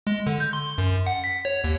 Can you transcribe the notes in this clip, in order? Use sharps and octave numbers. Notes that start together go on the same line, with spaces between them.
G#3
D3
G6
C6
F#2
F#5
B6
C#5
D#2